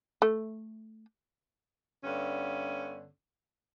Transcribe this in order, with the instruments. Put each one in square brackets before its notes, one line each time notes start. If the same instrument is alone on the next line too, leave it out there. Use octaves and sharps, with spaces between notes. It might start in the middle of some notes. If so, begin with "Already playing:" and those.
[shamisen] A3
[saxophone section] G2 D3 B3 C#4